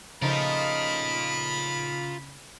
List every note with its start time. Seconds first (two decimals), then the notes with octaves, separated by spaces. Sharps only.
0.22 C#3 F3 A3 D#4 F4 A#4 B5